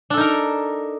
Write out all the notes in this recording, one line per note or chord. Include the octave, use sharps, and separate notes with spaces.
D4 D#4 A4 A#4